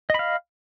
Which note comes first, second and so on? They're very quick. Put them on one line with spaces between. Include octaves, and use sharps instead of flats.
D#5 B5 F5